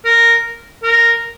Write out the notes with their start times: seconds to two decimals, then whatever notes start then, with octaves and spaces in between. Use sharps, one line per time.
0.05 A#4
0.83 A#4